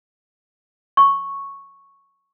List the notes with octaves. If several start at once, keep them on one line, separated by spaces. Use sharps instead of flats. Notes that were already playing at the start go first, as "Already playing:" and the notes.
C#6